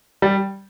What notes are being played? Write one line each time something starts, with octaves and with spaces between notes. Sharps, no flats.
G3